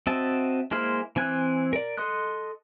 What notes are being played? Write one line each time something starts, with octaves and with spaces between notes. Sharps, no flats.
C4 F#4 D#5 E5 A5
G#3 A#3 E4 C5 F6
E3 C4 G#5 F#6
A#4 D5
A4 D#5 C6 D#6 F#6